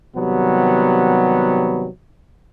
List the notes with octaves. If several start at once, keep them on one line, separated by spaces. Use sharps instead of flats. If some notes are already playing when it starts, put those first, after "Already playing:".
C3 D#3 F#3 G3 B3